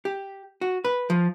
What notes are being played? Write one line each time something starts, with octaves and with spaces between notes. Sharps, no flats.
G4
F#4
B4
F3